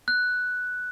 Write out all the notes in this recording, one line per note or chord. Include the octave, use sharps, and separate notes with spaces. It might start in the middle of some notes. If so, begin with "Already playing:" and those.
F#6